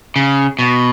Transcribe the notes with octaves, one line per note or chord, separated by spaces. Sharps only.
C#3
B2